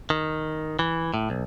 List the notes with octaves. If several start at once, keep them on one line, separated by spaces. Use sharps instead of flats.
D#3
E3
A2
B1